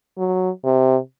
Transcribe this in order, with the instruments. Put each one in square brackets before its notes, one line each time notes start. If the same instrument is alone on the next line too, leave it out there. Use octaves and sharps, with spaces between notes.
[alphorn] F#3
C3